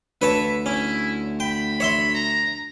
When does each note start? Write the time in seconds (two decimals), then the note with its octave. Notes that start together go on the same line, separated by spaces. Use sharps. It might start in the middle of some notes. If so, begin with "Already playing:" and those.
0.22 D2 B4 C#5 E5 A5
0.66 C#4 E4
1.40 G5 B5
1.80 C#5 E5 C6
2.14 A#5